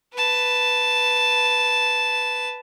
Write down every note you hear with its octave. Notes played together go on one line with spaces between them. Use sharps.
B4 A5